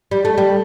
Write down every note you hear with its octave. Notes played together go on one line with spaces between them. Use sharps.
G3
A3
G3